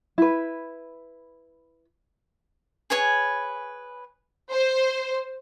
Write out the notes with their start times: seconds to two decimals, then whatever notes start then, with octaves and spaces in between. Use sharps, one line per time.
0.18 E4 B4
2.90 G#4 B4 C#5 G#5
4.50 C5